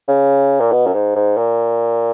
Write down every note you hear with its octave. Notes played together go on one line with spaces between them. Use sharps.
C#3
A#2
B2
F#2
G#2
G#2
A#2